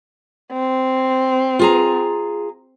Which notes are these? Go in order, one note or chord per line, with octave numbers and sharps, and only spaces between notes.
C4
F4 G#4 A#5